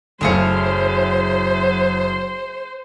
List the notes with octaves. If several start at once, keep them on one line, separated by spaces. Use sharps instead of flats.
F#1 F#3 A3 E4 G#4 C5 F5 C#7